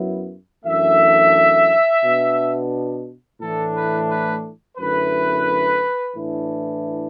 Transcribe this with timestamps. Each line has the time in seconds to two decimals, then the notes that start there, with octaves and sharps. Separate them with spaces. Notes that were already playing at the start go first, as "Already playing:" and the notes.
Already playing: F#2 F#3 B3 E4
0.64 F#2 E3 A3 D4 E5
2.02 B2 B3 D4
3.40 A2 E3 A3 D4 A4
3.75 B4
4.09 B4
4.78 F#2 D3 A3 E4 B4
6.16 A2 E3 D4